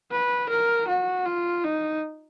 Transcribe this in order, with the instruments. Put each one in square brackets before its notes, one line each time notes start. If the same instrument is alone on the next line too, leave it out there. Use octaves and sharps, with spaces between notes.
[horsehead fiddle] B4
A#4
F#4
F4
D#4